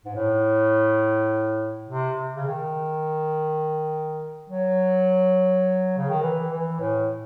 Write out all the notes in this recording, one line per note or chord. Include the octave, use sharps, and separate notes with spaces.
G#2
A2
C3
C#3
D#3
F#3
C#3
D#3
E3
E3
A2